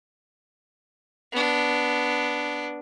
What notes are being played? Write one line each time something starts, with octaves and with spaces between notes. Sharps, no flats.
B3 D4